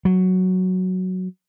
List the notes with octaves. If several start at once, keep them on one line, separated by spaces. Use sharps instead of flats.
F#3